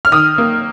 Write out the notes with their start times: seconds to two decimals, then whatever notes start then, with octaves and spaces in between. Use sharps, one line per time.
0.05 F6
0.12 D#3 D#6
0.38 A#3